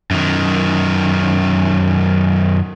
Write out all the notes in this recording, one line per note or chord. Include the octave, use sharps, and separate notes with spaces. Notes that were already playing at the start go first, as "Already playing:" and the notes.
F#2 D#3